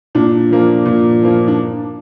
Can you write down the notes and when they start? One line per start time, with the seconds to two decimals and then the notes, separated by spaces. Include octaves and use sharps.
0.15 A#2 D4
0.50 F3 A#3
0.86 A#2
1.22 F3 A#3
1.48 D4